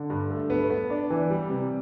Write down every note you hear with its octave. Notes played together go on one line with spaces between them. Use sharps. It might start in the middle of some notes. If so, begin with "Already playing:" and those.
Already playing: D3
G2
A3
B3
B3
D4
E3
G3
C3